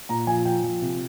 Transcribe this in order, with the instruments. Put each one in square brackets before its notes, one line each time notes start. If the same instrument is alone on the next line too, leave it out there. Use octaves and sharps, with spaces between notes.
[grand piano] A#2 A#5
F3 G#5
F3 G5
F3
C3